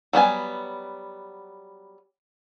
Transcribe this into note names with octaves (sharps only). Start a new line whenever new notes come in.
F#3 G3 B3 G#5